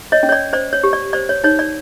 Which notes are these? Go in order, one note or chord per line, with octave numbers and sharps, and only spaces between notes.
C#5 D#5
C#4
C#5
D5
C5 D5
C#5
G4
D5
C5 D5
C#5
D#4 C#5
D5